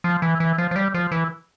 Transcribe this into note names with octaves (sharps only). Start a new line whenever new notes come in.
F3
E3
E3
F3
F3
G3
F3
E3